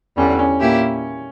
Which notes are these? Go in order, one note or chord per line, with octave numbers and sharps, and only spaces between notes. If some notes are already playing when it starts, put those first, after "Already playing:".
E2 D3 G3 C#4
C#4
A#2 A#3 E4 G4